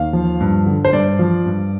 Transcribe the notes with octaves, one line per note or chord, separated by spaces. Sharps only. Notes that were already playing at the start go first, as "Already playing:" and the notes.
Already playing: D#2 F5
F3
G2
D3
C5
G2 D5
F3
G2